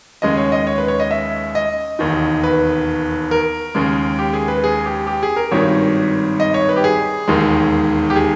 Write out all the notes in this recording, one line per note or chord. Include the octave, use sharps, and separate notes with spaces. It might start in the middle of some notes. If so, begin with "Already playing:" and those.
D#2 C#3 G#3 D#5
C#5
D#5
C#5
B4
C#5
D#5
E5
D#5
E1 D#2 D#3
B4
A#4
D#2 C#3 G#3
G4
G#4
B4
G#4
G4
G4
G#4
A#4
G#1 G2 D#3 C#5
D#5
C#5
B4
G4
G#4
E1 D#2 D#3 G#3
G4
G#4